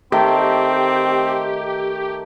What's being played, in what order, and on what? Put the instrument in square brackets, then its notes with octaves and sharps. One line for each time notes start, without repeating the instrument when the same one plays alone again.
[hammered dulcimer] D#3 A3 [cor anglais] C4 [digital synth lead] G4